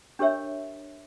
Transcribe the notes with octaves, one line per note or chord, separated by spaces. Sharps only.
D4 G4 A#4 C#5 E5